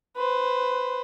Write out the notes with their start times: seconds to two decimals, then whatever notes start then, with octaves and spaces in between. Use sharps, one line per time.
0.17 B4 C5